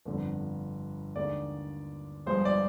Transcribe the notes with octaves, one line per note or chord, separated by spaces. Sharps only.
G1 F2 D3 F3
D#2 D3 G#3 D5
G1 G2 F3 G#3 C5
D5